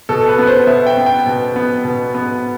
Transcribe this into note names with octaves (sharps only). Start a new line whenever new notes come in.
B2 A4
B4
B3
C5
B2 E5
G5
B3
G5
B2
B3
B2
B3